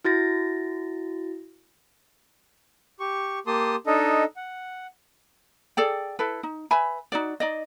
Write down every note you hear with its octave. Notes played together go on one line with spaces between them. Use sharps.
E4 F#4 A6 A#6
G4 C#6
A#3 G4 A5 C6 D#6
D4 D#4 A4 D#5
F#5
G#4 A4 D5 G5
E4 A4 B4
D#4
B4 E5 G#5 B5
D#4 F#4 D5
D#4 D5 D#5